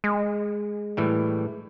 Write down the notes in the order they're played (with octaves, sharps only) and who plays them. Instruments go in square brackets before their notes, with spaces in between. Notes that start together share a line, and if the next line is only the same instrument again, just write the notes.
[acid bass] G#3
[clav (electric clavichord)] A2 E3 G3